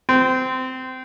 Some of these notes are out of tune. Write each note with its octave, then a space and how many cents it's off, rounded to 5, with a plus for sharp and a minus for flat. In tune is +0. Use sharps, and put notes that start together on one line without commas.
C4 -20